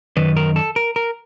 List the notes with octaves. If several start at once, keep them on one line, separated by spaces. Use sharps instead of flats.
F#2 D#3 B4
A#4
A4
A#4
A#4